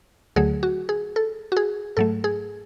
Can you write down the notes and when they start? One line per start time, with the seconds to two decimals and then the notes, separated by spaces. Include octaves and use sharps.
0.36 D2 D3 F#3 A3 G#4
0.63 F#4
0.89 G#4
1.16 A4
1.52 F#4
1.57 G#4
1.97 G#2 F#3 A3 A4
2.24 G#4